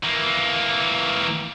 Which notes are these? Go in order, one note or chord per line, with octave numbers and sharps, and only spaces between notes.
E3 A#3